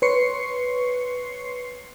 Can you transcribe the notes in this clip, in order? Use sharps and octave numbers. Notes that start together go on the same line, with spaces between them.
B4 C#5 C6 C#6 C7 C#7